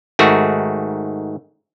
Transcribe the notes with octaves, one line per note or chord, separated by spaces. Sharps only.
G#2 D#3 A3 F#4